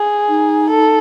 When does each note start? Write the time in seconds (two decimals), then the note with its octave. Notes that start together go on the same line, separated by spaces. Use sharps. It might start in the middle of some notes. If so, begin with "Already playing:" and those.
Already playing: G#4
0.29 D#4
0.70 A4